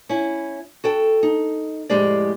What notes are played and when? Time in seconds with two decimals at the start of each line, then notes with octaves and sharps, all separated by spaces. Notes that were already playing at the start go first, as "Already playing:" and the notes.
0.09 C#4 E4
0.84 F#4 A4 G5
1.23 D#4
1.89 F2 A2 G#3 G4 G#4 D5